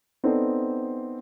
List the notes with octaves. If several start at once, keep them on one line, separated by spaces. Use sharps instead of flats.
B3 C4 D#4 A4 C5 D5